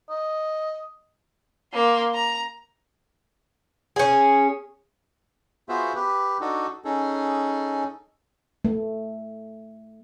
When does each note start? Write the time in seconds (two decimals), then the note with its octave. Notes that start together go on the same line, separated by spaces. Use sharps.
0.10 D#5
1.73 A#3 C6
2.14 A#5
3.96 C#4 G#4
5.69 B3 F4 F#4 G#4 C5 E5
5.95 G4 B4
6.41 D4 D#4 F#4 A4
6.85 C#4 D#4 G#4 A4
8.65 A3